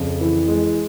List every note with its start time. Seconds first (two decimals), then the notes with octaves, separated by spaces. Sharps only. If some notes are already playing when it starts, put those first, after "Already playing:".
Already playing: F2 C#3
0.21 E3
0.48 G#3